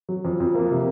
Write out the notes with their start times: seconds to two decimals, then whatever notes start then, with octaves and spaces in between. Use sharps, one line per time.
0.09 F#3
0.25 F2
0.40 F2
0.55 A#3
0.71 C3